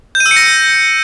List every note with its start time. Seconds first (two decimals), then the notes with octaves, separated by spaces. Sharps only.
0.15 G6
0.20 D#7
0.26 E6
0.31 C#7
0.36 A#6